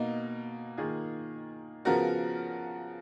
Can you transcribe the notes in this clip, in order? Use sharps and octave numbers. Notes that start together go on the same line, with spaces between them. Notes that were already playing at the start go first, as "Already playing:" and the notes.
Already playing: B2 A#3 D#4
D#3 A#3 F4 G#4
C#3 F3 B3 F#4 A#4